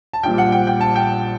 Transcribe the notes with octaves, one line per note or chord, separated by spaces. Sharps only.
A5
A#1 A#2 G3 G5
F#5
G5
G5
A5
G5